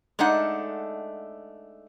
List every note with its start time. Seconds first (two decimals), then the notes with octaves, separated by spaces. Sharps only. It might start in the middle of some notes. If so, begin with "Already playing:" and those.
0.19 G#3 A3 D4 D#4 F#5